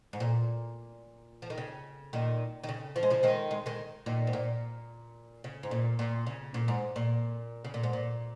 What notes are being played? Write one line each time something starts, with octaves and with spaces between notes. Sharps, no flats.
G#2
A#2
F3
D#3
C#3
A#2 D#3
D#3
C#3
F3
G#3
C#3 F3
D#3 G#3
G#3
D#3 G#3
A#2 D#3
G#2
A#2
C#3
G#2
A#2
A#2
C#3
A#2
G#2
A#2
C#3
A#2
G#2
A#2